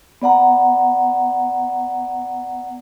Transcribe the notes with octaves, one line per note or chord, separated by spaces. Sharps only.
B3 D5 F#5 A#5